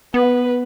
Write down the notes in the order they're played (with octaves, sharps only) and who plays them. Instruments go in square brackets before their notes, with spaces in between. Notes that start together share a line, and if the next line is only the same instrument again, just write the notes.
[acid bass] B3 [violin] B4